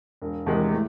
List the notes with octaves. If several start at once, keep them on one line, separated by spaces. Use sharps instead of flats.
E1
E2 C3 D#3 G#3
A2